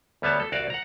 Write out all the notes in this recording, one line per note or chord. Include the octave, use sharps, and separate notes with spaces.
D2 G3 B3 C#5 A5
A4
C2 F#4 D5 F5
F#5 A#5